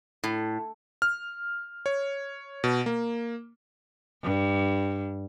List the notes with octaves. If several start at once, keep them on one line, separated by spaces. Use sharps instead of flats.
A2
F6
C#5
B2
A#3
G2